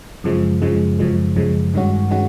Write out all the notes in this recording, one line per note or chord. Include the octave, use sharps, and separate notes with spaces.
F#2 C#3 F3 G#3
F#2 C#3 F3 G#3
F#2 C#3 F3 G#3
F#2 C#3 F3 G#3
G2 D#3 G#3 C#4 F#4
D#3 G#3 C#4 F#4